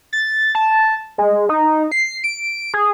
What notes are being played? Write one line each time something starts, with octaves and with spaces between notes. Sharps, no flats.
A6
A5
G#3
D#4
C7
D7
G#4